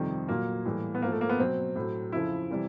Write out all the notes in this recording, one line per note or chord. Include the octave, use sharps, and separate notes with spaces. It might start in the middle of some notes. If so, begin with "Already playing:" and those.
Already playing: F2 C3 D#3 G3
A#2 F#3 A#3
A2 E3 G3
B3
G#2 A#3
F3
A3
A#3
B3
B2 F#3 C4
A2 F#3
F2 C#3 F3 E4
C3 E3 G3